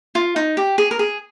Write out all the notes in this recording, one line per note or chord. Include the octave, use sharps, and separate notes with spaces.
F4
D#4
G4
G#4
A#4
G#4